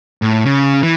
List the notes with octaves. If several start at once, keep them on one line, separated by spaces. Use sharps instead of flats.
A2
C#3
E3